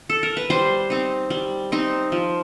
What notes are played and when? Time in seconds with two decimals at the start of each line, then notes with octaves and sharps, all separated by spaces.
0.10 A4
0.23 A#4
0.37 B4
0.50 G3 C5
0.90 C4 D#4
1.30 G3
1.72 C4 D#4
2.12 F3